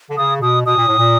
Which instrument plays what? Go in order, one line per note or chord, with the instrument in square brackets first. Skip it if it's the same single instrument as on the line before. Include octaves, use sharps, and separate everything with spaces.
[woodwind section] D3
[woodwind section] C#3 [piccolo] D#6
[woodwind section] B2 [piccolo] D#6
[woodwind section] B2 [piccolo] D#6
[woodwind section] A#2
A2
A#2